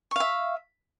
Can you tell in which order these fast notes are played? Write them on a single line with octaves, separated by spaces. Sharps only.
C#6 F5 E5